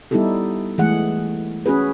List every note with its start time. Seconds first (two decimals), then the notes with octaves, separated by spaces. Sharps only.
0.11 G3 B3 D#4 E4 G4 A4
0.78 E3 G#3 A3 G#4 F#5
1.66 C#4 F#4 G#4 B4